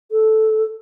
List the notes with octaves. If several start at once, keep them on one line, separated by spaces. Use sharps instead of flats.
A4